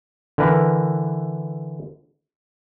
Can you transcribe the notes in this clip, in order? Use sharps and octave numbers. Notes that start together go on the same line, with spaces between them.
D3 E3 A#4 B4